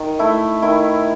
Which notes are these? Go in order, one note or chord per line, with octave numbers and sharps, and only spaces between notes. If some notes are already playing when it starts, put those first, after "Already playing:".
Already playing: D#3
A3 E4
D#3 E4